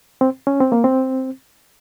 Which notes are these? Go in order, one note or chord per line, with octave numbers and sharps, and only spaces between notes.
C4
C#4
C4
A#3
C4